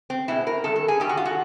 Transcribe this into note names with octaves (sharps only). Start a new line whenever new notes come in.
C4
B2 G#3 E4
A#4
G2 D#3 A4
A4
G#4
G2 D#3 G3 G4
F#4
F4
F#4